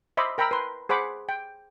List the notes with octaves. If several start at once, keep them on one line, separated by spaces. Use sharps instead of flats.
C5 D#5 E5 B5 C6 D6
A#4 G5 A#5 B5 E6
B4 C6
G#4 C5 F#5 B5 D6
G5